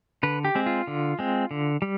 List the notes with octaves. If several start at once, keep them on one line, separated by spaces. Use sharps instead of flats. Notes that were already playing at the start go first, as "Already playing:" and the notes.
D3 B4
G4
G#3 C4
F4
D3
G#3 C4
D3
G3